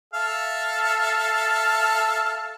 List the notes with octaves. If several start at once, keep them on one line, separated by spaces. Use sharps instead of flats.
A4 E5 F5